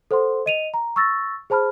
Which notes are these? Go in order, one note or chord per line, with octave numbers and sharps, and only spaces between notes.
A4 C5 F#5 C6
D#5 D#7 F7
A#5
C#6 E6 A6 A#6
G#4 C5 A5 B5 F6